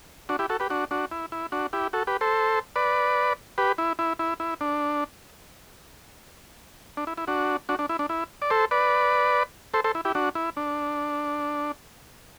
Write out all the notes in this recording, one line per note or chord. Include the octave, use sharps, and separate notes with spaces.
D4 F#4
E4 G4
F#4 A4
G4 B4
D4 F#4
D4 F#4
E4
E4
D4 F#4
E4 G4
F#4 A4
G4 B4
A4 C5
B4 D5
G4 B4
E4
E4
E4
E4
D4
D4
E4
E4
D4 F#4
D4 F#4
D4
E4
D4
E4
D5
A4 C5
B4 D5
A4 C5
A4 C5
E4
E4 G4
D4 F#4
E4
D4